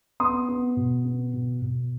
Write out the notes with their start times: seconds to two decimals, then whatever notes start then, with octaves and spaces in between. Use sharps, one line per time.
0.20 B3 C6 D#6
0.49 B3
0.77 B2
1.05 B3
1.33 B2
1.62 B2